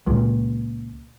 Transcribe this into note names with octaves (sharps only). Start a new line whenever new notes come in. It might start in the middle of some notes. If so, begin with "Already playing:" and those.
C#2 A#2